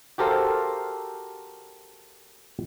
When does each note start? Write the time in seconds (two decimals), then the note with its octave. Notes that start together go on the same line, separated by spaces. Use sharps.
0.18 F#4 G4 A4 A#4 C5 F5